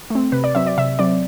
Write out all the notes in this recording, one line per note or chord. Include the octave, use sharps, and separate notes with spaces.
A3 C4
C3 B4
D5
F#3 C4 E5
D5
C3 E5
F#3 C4 D5